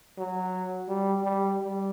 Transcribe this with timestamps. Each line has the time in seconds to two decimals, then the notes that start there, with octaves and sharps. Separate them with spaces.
0.18 F#3
0.88 G3
1.24 G3
1.59 G3